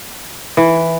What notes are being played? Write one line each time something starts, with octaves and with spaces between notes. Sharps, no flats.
E3